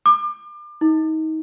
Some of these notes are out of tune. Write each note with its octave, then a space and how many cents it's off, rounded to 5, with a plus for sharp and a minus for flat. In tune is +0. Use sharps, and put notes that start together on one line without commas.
D6 +35
D#4 +30